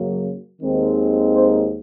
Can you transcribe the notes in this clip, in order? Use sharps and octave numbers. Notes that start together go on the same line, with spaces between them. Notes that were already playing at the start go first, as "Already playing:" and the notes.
Already playing: F#2 C#3 F#3 A#3
D#2 D#3 G#3 C4
C5